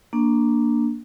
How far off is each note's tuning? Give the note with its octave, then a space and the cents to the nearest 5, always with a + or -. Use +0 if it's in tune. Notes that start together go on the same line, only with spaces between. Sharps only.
A#3 +0 D4 +0